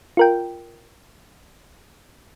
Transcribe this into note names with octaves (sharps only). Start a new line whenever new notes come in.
F4 A#4 G5